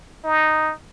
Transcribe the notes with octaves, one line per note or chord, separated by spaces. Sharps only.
D#4